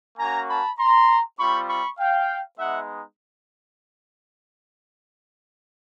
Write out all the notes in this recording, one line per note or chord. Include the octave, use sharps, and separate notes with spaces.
A#3 C#4 F#4 G#5 A#5
A5 B5
A#5 C6
G3 C4 F4 B5 C#6
B5 C#6
F5 G5
G#3 B3 D#4 E5 F#5